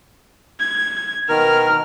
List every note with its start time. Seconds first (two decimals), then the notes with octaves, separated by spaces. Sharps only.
0.60 G#6
1.29 B2 D#3 A#4 F6